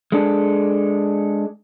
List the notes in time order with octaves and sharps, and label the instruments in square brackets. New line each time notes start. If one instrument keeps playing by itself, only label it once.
[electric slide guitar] G#3 D4 A4